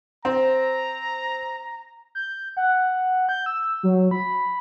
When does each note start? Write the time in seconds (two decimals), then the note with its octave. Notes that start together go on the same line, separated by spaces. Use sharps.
0.25 C4 A#5
2.15 G6
2.57 F#5
3.29 G6
3.46 E6
3.83 F#3
4.11 B5